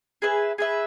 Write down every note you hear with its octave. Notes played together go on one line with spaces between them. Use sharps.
G#4 B4 E5
G#4 B4 E5